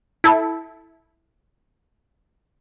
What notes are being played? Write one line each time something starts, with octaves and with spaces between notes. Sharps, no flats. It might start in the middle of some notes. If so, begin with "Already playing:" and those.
E4 A4